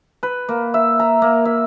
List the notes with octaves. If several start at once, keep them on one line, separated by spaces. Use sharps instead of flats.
B4
A#3
E5
A#5
A#3
E5